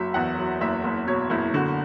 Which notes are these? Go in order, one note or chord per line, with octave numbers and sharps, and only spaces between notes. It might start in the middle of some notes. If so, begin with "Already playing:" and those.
Already playing: F#1 F#3 E5
E2 F#5
F#3
F#1 E5
F#1
B2 C#5
F#1 E4
D3 F#4